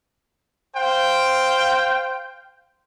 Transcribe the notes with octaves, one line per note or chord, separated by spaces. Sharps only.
C5 F5 G5